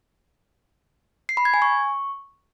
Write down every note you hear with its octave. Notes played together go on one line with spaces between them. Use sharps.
C7
B5
G#6
G#5
C#6